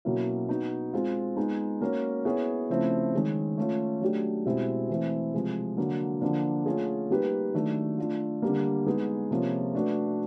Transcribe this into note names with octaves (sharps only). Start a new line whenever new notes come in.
B2 F#3 A#3 C#4 E4
B3 D#4 F#4
G#3 C4 F4
G#3 B3 D#4
A#3 C#4 F#4 A#4
B3 E4 G#4 C#5
C#3 F3 A3 C4 E4
D#3 G#3 C#4
A3 C#4 F4
F#3 A3 D4 G4
B2 G#3 C4 E4 G4
E3 A3 C4 E4
C3 F3 G#3
D3 F#3 A#3
D3 F3 A#3 D4
A3 C#4 F4 G#4
G3 A#3 D#4 G4 B4
D#3 F#3 A3 D4
A3 D4 F4
D3 G3 A#3
G#3 B3 D#4 G#4 B4
C3 F3 A#3 C#4 F4
A3 D4 F#4 B4